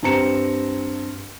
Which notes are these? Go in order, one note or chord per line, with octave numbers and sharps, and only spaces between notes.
G2 C4 A#5 C#7 E7